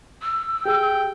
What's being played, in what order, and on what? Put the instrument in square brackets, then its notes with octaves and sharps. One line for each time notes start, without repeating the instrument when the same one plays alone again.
[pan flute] E6
[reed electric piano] G4 G#4 [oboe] G5